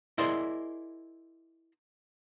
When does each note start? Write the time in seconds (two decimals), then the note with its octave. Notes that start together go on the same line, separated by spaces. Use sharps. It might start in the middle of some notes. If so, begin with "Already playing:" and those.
0.18 E4 G#4 A#4 C5 D5 D#5